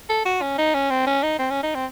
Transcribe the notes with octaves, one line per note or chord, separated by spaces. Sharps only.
A4
F#4
C#4
D#4
C#4
C4
C#4
D#4
C4
C#4
D#4
C4